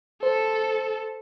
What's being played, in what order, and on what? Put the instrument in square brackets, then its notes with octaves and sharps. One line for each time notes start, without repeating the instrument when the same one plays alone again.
[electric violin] A4 [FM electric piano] C5